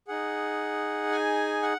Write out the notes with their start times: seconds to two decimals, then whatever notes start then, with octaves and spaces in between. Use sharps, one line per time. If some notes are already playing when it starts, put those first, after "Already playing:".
0.08 D#4 G#4 F#5
1.11 G#5
1.63 F#5